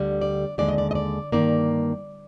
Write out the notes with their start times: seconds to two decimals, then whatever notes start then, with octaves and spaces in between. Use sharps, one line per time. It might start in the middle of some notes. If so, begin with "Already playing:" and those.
Already playing: D2 D3 G3
0.21 D5
0.58 D#2 D3 G#3 D5
0.68 D#5
0.78 D5
0.91 D#5
0.95 D5
1.32 G2 D#3 A#3 D5